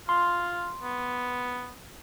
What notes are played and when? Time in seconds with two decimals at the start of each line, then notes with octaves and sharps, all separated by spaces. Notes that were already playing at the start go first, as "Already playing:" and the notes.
0.09 F4 C6
0.82 B3